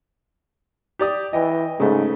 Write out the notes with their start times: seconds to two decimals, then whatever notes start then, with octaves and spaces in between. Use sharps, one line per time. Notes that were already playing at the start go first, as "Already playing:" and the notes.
0.99 G4 D5 D#6
1.33 E3 D#5 G5
1.80 G#2 C#3 A3